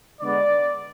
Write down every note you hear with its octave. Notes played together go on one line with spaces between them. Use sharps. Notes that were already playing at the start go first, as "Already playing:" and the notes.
D3 G#3 B3 D5